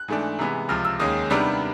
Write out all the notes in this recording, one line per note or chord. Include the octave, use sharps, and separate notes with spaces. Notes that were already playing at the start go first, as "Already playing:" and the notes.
Already playing: F#6
G#2 E3 A3 D4
C3 E3 G#3 B3
C#2 C3 F3 F6
E6
D#2 D#3 G#3 C#4 D#6
C3 D#3 G3 B3 D4